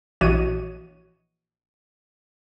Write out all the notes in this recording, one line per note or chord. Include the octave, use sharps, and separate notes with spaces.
A#1 E3 F#4 C#5 D#5 D#7